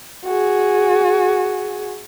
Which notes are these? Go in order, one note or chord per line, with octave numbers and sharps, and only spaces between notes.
F#4 G#4